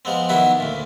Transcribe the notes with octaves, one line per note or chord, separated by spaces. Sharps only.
F3 G#3 B3 C4
D#3 F#3 B3 E4 F#4
D2 A#2